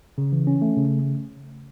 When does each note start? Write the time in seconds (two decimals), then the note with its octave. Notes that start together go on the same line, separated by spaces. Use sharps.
0.18 C#3
0.33 E3
0.47 C#4
0.62 A3
0.77 C#3